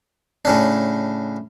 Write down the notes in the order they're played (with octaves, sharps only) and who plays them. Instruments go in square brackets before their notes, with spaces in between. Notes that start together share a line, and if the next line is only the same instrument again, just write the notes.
[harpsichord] A2 C#3 D4